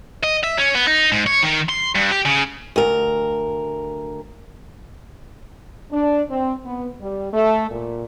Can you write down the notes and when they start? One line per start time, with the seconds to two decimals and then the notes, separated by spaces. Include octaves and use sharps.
0.24 D#5
0.44 E5
0.58 C#4
0.75 B3
0.87 D#4
1.12 G#2
1.27 C#5
1.43 D#3
1.69 C6
1.95 G2
2.11 G4
2.25 C#3
2.76 D2 A#4
5.91 D4
6.29 C4
6.66 B3
7.01 G3
7.33 A3
7.71 A#2